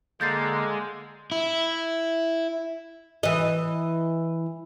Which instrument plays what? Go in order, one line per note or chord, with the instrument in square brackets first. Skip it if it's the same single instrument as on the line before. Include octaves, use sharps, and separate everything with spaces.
[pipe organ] D3 A#3 [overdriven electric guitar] G#3 [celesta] G6 A6 C7
[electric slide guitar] E4
[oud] E3 D#5